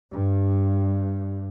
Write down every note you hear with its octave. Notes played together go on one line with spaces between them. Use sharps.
G2